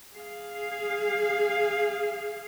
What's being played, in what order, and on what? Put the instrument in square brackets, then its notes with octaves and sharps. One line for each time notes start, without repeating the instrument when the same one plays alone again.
[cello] G#4 F5